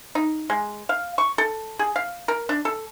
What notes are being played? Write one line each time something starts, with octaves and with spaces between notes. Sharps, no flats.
D#4
G#3
F5
C#6
A4
G#4
F5
A#4
D4
A4